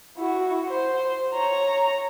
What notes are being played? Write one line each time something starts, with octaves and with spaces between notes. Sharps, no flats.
E4 F#4
C5
C#5 A#5